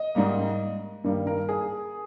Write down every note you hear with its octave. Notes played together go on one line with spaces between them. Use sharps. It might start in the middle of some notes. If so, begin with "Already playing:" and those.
Already playing: D#5
G#2 G3 A#3
G2 D#3 G3 A#3
A#4
G#4